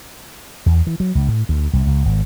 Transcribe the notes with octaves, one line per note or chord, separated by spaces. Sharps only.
E2
E3
F#3
C#2
A2
D2
C2
C#2
G#1